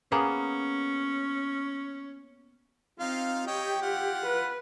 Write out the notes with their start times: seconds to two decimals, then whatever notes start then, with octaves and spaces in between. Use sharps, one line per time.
0.12 A#3 B3 C#4 G#4
2.99 C4 D#4 F4 F5
3.47 G4 C#5 D#5 G5
3.82 F4 F#5
4.26 B4